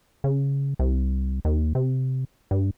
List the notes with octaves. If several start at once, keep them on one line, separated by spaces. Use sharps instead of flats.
C#3
C2
D#2
C3
G2